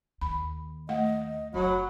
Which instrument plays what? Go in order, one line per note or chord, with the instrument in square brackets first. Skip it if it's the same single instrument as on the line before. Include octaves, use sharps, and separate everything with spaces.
[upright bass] D#2 [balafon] B5
[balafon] A3 F5 F#5 [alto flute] D#5
[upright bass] F#1 [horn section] F#3 [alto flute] B5